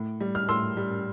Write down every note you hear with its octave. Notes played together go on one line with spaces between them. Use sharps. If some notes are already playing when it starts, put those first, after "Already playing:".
Already playing: A2
G3
F6
A2 C6 E6
G3